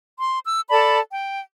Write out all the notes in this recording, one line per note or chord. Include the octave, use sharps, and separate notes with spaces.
C6
E6
A4 D5 A5 B5
G5